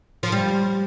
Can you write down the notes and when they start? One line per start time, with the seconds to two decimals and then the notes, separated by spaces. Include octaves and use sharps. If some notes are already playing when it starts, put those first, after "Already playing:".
0.23 F3
0.32 G3